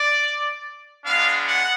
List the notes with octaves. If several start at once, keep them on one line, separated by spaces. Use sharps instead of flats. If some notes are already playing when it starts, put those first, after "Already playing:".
Already playing: D5
G#3 B3 D4 F5
F#5